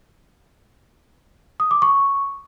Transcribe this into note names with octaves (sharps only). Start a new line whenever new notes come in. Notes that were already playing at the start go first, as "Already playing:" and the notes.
D#6
D6
C#6